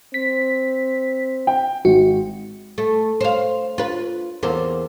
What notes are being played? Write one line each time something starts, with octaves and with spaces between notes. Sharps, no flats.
C4 B6
G5
G#1 F#4
A3
C5 F5
F4 B4
E2 A#3 C4